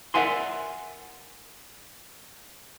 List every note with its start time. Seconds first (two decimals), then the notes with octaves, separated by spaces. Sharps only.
0.14 A#4 D5 E5 F#5 G#5 C6